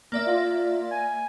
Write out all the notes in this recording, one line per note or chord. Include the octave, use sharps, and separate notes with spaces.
A#3 D5 E5
F4
G#5